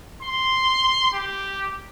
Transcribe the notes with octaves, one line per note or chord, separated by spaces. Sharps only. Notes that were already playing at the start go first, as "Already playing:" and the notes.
C6
G4